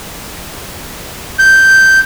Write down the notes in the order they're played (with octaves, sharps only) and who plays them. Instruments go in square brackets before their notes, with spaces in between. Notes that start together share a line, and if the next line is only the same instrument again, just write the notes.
[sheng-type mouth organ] G6